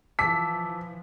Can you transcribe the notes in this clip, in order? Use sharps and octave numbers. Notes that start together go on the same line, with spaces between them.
E3 F3 A5 D6 E6 B6